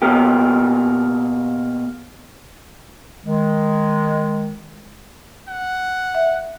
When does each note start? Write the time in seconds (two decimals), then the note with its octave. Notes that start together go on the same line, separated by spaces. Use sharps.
0.02 B2 A#3 G4
3.26 D#3 G#3
5.48 F#5
6.15 E5